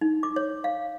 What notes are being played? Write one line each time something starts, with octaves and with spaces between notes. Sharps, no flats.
D#4
D6
C#5
F5